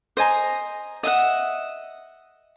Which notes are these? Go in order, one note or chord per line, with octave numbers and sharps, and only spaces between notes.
C5 D#5 G#5 A#5
D#5 E5 F#5